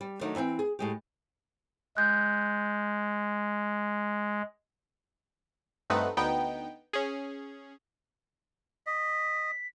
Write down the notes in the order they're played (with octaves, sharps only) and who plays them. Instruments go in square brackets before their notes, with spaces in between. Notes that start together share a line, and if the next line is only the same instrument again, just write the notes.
[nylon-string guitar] G3
D#3 F#3 A3 D4 D#4
E3 C4 G5
G#4
A2 G#3 G4
[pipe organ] G#3 [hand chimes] F#6 G6
[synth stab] G2 A3 C4 D#4 B4 F#5
D2 B3 D#4 G5
C#4 G#4
[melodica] D#5 [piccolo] B6